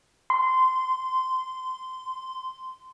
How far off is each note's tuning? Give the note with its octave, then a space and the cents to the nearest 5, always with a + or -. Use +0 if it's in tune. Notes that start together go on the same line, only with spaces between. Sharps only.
C6 -20